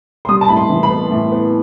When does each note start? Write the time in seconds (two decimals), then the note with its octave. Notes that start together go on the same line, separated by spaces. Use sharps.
0.25 C6
0.29 G3 D#6
0.41 A5
0.48 A2 B5
0.57 C6
0.70 E3
0.83 B5
0.90 B3
1.11 A2
1.32 B3